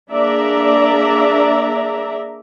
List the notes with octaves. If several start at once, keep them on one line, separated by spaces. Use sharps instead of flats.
A#3 D4 G#4 D5 E5 A#5